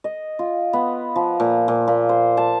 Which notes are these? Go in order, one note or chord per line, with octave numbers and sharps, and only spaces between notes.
D#5
F4
B3
F3
A#2
A#2
A#2
C5
A5